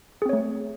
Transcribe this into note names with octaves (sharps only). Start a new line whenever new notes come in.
A3 C4 G#4 C#5